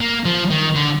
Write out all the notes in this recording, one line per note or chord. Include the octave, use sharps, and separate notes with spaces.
A#3
F3
D#3
D3